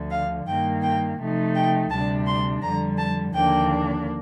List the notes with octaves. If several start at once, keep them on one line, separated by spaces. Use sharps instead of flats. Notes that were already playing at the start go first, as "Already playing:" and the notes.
Already playing: D2 D3 F3
F5
G2 D#3 A#3 G5
G5
C3 F3 A3 D#4
G5
D2 C3 G3 D4 A5
C6
F2 D3 G3 A#5
A5
D#2 D3 F3 A#3 D4 G5